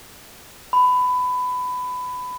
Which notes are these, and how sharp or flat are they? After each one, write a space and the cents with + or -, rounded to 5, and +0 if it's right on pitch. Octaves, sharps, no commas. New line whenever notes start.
B5 +20